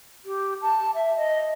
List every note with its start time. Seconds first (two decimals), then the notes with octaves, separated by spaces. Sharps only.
0.25 G4
0.61 A5
0.94 E5
1.17 D#5